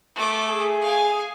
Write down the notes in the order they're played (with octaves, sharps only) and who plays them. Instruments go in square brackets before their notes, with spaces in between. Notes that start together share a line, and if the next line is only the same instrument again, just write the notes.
[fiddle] A3 D6
[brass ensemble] G#4
[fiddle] F5 G#5